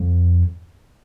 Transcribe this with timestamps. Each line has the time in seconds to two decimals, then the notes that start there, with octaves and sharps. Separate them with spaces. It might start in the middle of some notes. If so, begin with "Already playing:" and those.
Already playing: F2